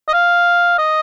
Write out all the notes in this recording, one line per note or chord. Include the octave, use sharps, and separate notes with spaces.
D#5
F5
D#5